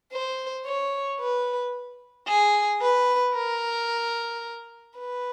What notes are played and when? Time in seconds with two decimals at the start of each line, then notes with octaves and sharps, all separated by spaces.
0.12 C5
0.66 C#5
1.20 B4
2.28 G#4
2.82 B4
3.35 A#4
4.98 B4